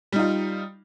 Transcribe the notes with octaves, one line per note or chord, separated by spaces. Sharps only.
G3 D#4 F4